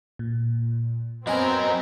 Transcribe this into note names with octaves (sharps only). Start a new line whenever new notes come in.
A#2
F#3 B3 C4 A#4 D#5 G#5